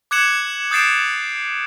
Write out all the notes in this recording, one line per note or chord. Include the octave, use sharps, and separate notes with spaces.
D6 F#6 G#6 C#7 E7 F#7
D#6 G6 A6 C7 D7 E7